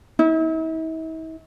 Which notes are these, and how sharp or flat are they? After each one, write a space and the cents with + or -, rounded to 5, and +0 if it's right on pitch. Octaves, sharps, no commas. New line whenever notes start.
E4 -45